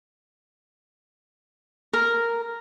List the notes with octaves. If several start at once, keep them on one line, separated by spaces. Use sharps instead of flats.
A#4